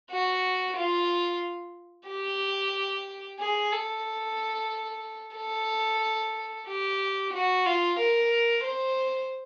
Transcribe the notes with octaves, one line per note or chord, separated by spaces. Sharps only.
F#4
F4
G4
G#4
A4
A4
G4
F#4
F4
A#4
C5